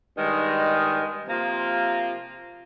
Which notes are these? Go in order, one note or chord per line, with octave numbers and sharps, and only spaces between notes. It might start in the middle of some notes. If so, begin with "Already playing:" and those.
G2 D#3 G#3
C3 F3 A#3 F4